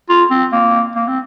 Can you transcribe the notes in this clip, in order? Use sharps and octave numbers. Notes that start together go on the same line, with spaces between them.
F4
C4
A#3
A#3
C4